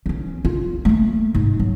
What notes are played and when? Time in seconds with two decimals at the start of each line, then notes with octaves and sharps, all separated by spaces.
0.06 E3 C#4
0.45 F4
0.85 A3 A#3
1.35 G#2
1.60 F#3